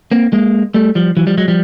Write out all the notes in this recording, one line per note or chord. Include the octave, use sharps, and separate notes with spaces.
A#3 C4
G#3 A#3
G3 A3
F3 G3
E3 F#3
F3 G3
F#3 G#3
F3 G3